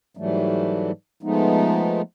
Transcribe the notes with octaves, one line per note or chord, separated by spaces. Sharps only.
G#2 E3 F#3 G3 A3
F3 G#3 A3 B3 D#4